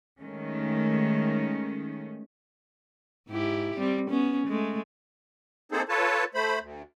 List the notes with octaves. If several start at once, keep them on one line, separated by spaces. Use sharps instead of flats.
D#3 G#3 A3 C#4
G#2 E4 G4
G3 C4
B3 C#4
G#3 A3
A#3 C4 D#4 G#4 A4 C5
F4 A4 B4 C#5 A5
A3 C5 B5
D2